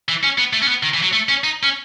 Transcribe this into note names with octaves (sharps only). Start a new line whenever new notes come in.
E3
C#4
B3
A3
C#4
B3
D#3
E3
F#3
A3
C#4
D#4
C#4